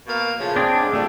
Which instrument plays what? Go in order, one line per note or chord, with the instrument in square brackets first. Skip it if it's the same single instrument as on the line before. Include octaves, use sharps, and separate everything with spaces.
[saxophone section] B2 A#3 F5
A2 C#3 F3
[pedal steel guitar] C4 D4 G#4
[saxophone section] G#2
[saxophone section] F3 G3 [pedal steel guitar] A3